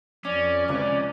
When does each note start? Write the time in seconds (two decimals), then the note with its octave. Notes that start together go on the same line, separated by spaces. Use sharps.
0.25 F2 C#4 D5
0.69 C#2 C3 B4 D5